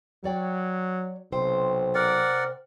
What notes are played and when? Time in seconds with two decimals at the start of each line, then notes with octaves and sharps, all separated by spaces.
0.24 F#3 C#5 D5 G5
1.32 B1 C3 C5 G5
1.95 A#4 D5 F#5